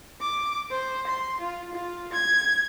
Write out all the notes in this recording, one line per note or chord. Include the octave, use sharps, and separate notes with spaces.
D6
C5
C6
F4
F4
G#6